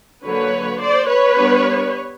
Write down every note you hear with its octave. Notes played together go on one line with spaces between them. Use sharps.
D3 F#3 A#3 B4 C#5
C5 D5
B4 C#5
G3 B3 D4